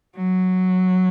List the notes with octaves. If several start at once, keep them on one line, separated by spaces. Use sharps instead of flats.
F#3